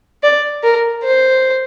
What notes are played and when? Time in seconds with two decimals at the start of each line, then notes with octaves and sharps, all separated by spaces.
0.23 D5
0.63 A#4
1.03 C5